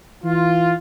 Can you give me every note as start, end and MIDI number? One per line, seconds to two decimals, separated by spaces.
0.24 0.74 52
0.24 0.75 65